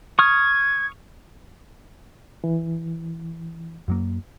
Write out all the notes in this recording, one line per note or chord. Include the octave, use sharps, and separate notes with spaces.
C#6 D#6 F6 G#6
E3
F#2 F#3 A#3